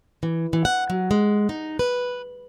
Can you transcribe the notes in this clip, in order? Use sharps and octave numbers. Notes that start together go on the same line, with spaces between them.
E3
E3
F#5
F#3
G#3
D#4
B4